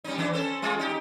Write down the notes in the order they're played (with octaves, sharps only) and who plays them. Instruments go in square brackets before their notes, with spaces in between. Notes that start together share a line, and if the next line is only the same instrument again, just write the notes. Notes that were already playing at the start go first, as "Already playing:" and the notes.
[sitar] G3 C#4 D#4
E2 E3 D4
C#4 A4 C5
G#3 F4 G#4
D#4 G4